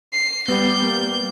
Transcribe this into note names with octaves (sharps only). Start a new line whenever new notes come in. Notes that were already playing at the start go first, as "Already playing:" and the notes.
C7
G3 B3 G6
A#3